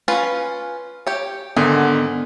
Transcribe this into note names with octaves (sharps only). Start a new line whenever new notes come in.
C#4 F4 B4
G4 C#5
G#2 D3 D#3 B3 G#4